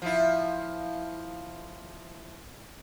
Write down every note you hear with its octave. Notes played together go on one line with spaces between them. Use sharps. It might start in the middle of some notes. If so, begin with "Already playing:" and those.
F3 E4